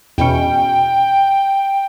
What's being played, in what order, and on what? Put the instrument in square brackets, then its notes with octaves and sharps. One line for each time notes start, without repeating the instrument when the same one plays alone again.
[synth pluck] E2 B2 C#4 [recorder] G5